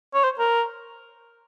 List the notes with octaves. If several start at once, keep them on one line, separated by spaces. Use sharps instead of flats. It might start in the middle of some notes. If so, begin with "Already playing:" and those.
C#5
C5
A#4